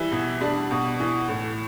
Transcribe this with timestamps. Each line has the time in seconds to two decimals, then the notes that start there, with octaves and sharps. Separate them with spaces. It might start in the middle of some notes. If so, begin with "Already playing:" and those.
Already playing: E3 G3 E4
0.12 B2
0.41 G3 D4
0.71 B2
1.00 E3
1.28 A2